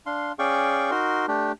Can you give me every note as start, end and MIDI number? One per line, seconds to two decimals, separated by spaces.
0.06 0.32 62
0.06 0.32 77
0.06 0.32 84
0.39 0.91 61
0.39 0.91 68
0.39 0.91 74
0.39 0.91 77
0.39 0.91 79
0.39 0.91 85
0.91 1.26 63
0.91 1.26 66
0.91 1.26 70
0.91 1.26 84
1.28 1.52 57
1.28 1.52 62
1.28 1.52 67